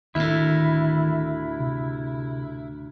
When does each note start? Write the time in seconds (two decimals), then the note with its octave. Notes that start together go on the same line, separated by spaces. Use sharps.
0.15 D2 A2 D#3 E4
1.59 C3